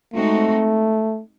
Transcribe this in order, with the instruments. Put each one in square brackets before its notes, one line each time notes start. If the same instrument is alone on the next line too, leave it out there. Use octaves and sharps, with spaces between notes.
[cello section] G#3 C4 D#4 F#4 [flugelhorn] A3